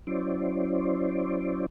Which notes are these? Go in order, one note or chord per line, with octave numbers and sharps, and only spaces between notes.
F#3 C#4 E4 C5 D5